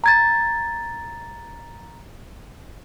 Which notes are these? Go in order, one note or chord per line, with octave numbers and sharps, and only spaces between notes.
A#5 G#6 A6